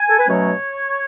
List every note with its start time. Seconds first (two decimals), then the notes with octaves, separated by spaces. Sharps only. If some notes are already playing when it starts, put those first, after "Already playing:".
Already playing: G#5
0.09 A4
0.18 B4
0.28 B2 F#3 A3 C#4 C#5